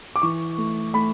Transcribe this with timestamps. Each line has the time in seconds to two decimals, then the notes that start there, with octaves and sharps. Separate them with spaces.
0.16 D6
0.22 E3 C#6
0.58 A3
0.94 A3 B5